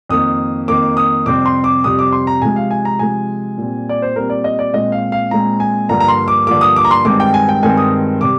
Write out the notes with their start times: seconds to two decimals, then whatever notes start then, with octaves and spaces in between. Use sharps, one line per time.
0.09 F2 D#3 A#3 D#6
0.68 F2 D#3 A#3 D6
0.97 D#6
1.26 F2 C3 G3 C4 D6
1.46 C6
1.64 D6
1.84 F2 C3 G3 C4 D#6
1.99 D6
2.12 C6
2.27 A#5
2.42 C3 F3 G#3 G#5
2.56 F5
2.71 G#5
2.85 A#5
2.99 C3 F3 G#3 G#5
3.58 A#2 G3 C4
3.89 D5
4.02 C5
4.16 A#2 G3 C4 A#4
4.30 D5
4.44 D#5
4.59 D5
4.74 A#2 G#3 C4 D#5
4.92 F5
5.12 F5
5.31 A#2 G#3 C4 A#5
5.60 G#5
5.89 G2 D3 F3 A#3 A#5
6.00 A#5
6.08 C6
6.28 D6
6.47 G2 D3 F3 A#3 D6
6.61 D#6
6.76 D6
6.85 A#5
6.91 C6
7.05 G2 D#3 G#3 C4 D6
7.20 G5
7.34 G#5
7.49 G5
7.63 G2 D#3 G#3 C4 G#5
7.77 D#6
8.21 C3 G3 D6